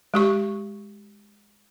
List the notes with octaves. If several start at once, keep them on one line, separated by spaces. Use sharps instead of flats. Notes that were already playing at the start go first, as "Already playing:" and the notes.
G#3 G4 C#6